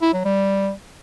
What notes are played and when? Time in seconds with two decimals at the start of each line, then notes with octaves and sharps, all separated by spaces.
0.02 E4
0.13 F#3
0.25 G3